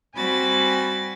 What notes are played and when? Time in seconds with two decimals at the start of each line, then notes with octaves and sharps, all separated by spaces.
0.14 G3 C4 F#4 G#5 B5 A6